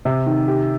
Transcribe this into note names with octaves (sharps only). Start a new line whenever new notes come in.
C3
D#3
G4